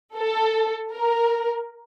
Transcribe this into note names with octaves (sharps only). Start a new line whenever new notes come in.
A4
A#4